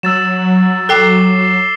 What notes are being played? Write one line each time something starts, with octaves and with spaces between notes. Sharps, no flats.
F#3 E6 A6 E7
A4 G5 D6 C7 G7